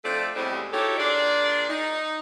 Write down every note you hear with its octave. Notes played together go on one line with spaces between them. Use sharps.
F3 A3 C4 D4 A4 D5
E2 A2 G3 G#3 C4
D#4 E4 F#4 G4 A4 C#5
A#2 D4 G#4 D5
D#4